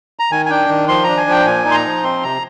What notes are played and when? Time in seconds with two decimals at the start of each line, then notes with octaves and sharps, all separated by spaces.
0.19 A#5
0.32 D#3 G#5
0.46 G#5
0.50 D4 G5
0.69 D#3
0.88 F3 C6
1.04 D4 A#5
1.17 G#5
1.27 F3 G5
1.46 A#2 G#5
1.65 D#4
1.71 C6
1.74 A#5
1.85 F3
2.03 C4 C6
2.23 C3 A#5